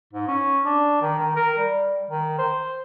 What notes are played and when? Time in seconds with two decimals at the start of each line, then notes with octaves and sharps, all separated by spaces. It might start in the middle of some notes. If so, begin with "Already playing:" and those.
0.13 G#2
0.28 C#4
0.65 D4
1.01 D#3
1.18 D#3
1.36 A#4
1.58 G3
2.10 D#3
2.38 C5